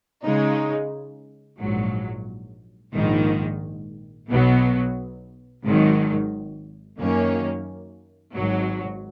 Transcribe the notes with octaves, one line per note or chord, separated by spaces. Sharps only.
C#3 G#3 D#4
A#1 G#2 F#3
A#1 G#2 D#3
B1 B2 F#3 B3
G#1 G#2 D#3 F#3
F#2 D#3 A#3 C#4
G#1 G#2 F#3